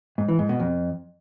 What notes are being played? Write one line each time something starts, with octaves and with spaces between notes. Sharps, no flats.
G#2
E3
G#2
B2
F2